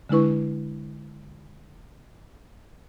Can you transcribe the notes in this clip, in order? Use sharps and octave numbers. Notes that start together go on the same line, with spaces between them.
D3 G#3 D4 E4 B4 C#6